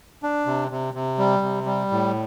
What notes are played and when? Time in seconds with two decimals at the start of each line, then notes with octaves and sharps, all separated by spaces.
0.23 D4
0.46 C3
0.71 C3
0.94 C3
1.18 G3
1.42 C3
1.66 G3
1.91 A2